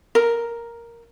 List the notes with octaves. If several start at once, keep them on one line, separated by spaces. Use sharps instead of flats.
A#4